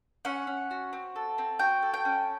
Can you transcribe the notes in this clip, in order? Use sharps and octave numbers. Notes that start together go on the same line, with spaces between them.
C#4 F#5
C#4
F#4
C4
A4
C4
F#4 G5
A4
G5
C#4